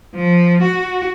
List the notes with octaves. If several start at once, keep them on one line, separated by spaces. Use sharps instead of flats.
F3
F#4